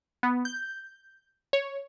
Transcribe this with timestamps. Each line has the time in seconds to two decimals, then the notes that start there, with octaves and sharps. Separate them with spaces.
0.23 B3
0.45 G6
1.53 C#5